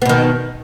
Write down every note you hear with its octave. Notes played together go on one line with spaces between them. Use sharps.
B2 D#3 B3